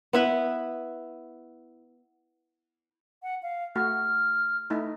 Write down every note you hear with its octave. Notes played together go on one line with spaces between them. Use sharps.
B3 E4 B4
F#5
F5
A3 F#4 F6
A3 D#4 E4